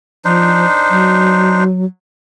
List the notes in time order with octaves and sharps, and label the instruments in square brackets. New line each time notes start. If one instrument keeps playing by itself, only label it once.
[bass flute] F3 [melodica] D4 D#4 C5
[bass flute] F#3